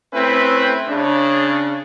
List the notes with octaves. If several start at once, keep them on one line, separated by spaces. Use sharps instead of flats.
A3 C4 C#4 E4 B4
C#3 D4